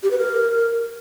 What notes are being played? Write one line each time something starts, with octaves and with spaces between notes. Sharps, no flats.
G4
B4
A#4